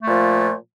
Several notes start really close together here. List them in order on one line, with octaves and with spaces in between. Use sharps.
A3 A#2 F3